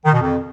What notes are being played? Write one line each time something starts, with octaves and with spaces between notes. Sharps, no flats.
D#3
B2
F2